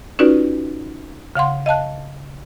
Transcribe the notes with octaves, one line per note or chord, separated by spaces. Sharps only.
C#4 D#4 F4 F#4 B4 D5
C#3 F5 F#5 C6
D#5 F5 A5 F#6